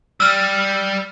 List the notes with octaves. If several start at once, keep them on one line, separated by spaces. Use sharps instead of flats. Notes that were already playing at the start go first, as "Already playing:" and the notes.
G3 E6 F6